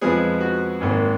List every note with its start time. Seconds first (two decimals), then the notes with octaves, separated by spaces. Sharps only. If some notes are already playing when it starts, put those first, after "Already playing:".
0.01 F2 F3 G#3 B3 G#4
0.40 F#4
0.80 G#1 G#2 D#3 A#3